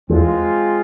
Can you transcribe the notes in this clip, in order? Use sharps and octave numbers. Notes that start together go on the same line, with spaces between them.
E2 G#3 C4 F4 G#4